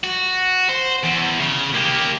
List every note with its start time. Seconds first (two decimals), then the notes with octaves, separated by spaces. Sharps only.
0.04 F#4
0.70 C5
1.04 E2
1.40 C#3
1.74 A#3 G4